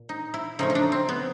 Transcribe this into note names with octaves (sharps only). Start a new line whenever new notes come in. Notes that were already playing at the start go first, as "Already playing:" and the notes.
Already playing: A#2
D#4
E4
C#3 F3 A3 D#4
D#4
D4
C4
B3